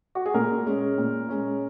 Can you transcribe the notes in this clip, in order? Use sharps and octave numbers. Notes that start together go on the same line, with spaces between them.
F#4
G#4
A#2 A#4
G#3 C#4
A#2
G#3 C#4